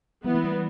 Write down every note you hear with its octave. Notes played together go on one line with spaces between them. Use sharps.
E3 G3 B3 E4
A3
G3